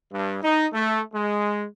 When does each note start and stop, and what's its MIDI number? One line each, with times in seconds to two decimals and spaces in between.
0.11 0.38 43
0.42 0.65 63
0.72 1.01 57
1.13 1.66 56